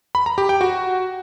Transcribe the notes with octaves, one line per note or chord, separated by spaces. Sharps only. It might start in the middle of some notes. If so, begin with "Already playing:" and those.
B5
A#5
G4
G5
F#4